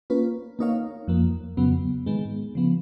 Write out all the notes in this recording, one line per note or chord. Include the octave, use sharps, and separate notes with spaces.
A#3 C#4 F4 B4
A#3 D#4 A#4 C#5 F5
F2 F3 A#3
F2 C#3 F#3 B3
G#2 D#3 G#3 B3
C#3 F3 B3